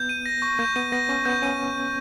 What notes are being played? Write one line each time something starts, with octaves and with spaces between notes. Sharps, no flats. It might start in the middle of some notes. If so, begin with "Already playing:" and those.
Already playing: B3 G6
D#7
A#6
C#6
A#3 G6
B3 D#7
B3 A#6
C#4 C#6
B3 G6
C#4 D#7